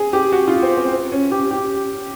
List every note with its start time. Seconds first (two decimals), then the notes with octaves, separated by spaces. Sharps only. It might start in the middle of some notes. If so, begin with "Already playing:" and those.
Already playing: G#4
0.13 G4
0.32 F#4
0.48 F4
0.63 C4
0.77 C4
1.12 C#4
1.31 G4
1.51 G4